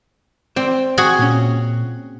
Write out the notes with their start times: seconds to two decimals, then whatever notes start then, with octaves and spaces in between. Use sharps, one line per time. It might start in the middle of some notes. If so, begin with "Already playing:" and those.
0.56 C4 C5 D5
0.97 F#4 G#4 F#5
1.19 A#2 C#4